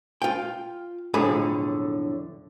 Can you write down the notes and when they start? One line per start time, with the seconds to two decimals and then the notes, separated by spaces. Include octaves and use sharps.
0.22 F4 G5
1.14 B1 F2 A2 D3 G#4 B5